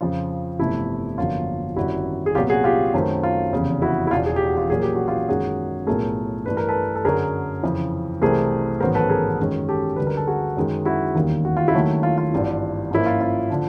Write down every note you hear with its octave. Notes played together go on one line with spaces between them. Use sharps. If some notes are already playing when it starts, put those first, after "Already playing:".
F2 C#3 F3 F4
G1 F2 C3 E3 A3 E4
G1 F2 D3 F#3 A#3 F4
G#1 F#2 D3 G3 E4 F#4
G#4
C2 A#2 F#3 B3 F4 G4
F#4 G#4
F4 G4
F#2 D#3 F#3 A3 C4
F4
F1 E2 C#3
E4 F#4
E4
E1 E2 B2 F4
G#4
G4
F#4
F4 G4
A#1 A#2 F#3 A#3 G#4
G4
F#4
F4 G4
F#2 D#3 G#3 F#4 G#4
B1 A2 F3 A3 G#4 A#4
G2 E3 A3 B4
A#4
A4 B4
A4
F#2 D3 F#3 G#4 A#4
F2 C#3 E3
C2 C3 E3 A3 C4 G#4 A#4
A1 G#2 D#3 F#3 B3 A#4 C5
A4 B4
G#4 A#4
F#2 D#3 G#3 C#4
G4 A4
D2 D3 G3 B4
A#4
A4
F#4 G#4
F#2 D#3 G#3
E4 F#4
E1 D#2 D#3 G3
F#4
F4
E4 F#4
D#2 D#3 F#3 A3
F4
F4
G#1 G2 E3
G#2 F3 A#3 C#4 E4
F4
F4
D3 F3